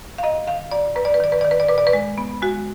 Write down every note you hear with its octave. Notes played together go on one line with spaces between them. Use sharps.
F5
F#2 D#5
D#3 F5
F#2 D5
F#2 B4
D5
B4
D#3 D5
B4
D#3 D5
B4
D5
A#2 B4
D5
B4
G#3
B3
G#3 F#4